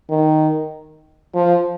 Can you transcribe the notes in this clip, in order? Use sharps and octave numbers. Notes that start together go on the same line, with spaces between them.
D#3
F3